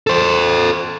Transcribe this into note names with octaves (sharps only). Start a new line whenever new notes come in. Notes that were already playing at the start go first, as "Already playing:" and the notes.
A4 C5